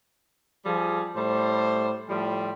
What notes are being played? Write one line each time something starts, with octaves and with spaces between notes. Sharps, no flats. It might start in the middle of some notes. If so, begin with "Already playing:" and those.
F3 G3 G#4
A2 G3 C5
A2 F3 G3